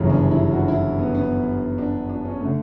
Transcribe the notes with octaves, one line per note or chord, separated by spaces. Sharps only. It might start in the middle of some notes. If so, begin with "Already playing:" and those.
Already playing: G1 F#2 C#3 E3 C#4
D4
E4
F#4
E4
B3
B3
D4
D4
C#4
D3 A3